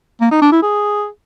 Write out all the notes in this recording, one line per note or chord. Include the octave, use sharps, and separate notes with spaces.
A#3
D#4
D4
E4
G#4